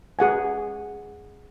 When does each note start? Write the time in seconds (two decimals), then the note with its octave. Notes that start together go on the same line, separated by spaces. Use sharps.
0.19 G#4 F#5 G#5